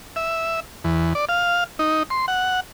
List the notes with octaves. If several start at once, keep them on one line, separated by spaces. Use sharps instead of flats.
E5
E2
D5
F5
D#4
C6
F#5